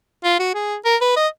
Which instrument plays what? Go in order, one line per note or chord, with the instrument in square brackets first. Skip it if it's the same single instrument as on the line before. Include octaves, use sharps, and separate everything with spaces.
[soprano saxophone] F4
F#4
G#4
A#4
B4
D#5